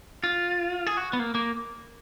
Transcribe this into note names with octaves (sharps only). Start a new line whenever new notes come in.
F4
G#4
F#4
B3
A#3
A#3